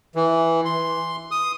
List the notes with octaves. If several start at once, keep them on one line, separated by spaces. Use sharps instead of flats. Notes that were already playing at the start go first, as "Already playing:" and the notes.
E3
C6
D#6